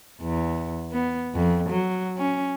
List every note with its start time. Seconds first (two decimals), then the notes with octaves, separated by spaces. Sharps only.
0.22 E2
0.92 B3
1.35 F2
1.70 F#3
2.17 C#4